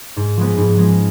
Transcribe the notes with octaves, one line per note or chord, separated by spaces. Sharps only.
G#2
F3 G#3 B3
G#2
F3 G#3 B3